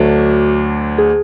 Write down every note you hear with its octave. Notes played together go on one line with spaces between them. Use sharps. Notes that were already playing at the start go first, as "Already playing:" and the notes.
Already playing: D2 D3 F#3 A3 D4 F#4
G#4